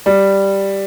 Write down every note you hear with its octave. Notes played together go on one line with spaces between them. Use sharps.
G3